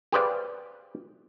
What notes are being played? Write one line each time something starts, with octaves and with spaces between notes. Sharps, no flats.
G4 G#4 B4 C5 D5 F5